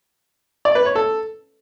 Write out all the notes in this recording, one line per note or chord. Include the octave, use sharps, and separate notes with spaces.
D5
B4
C#5
A4